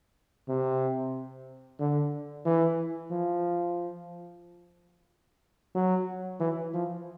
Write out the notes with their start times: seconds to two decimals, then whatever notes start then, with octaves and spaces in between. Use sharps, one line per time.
0.48 C3
1.79 D3
2.45 E3
3.11 F3
5.75 F#3
6.40 E3
6.74 F3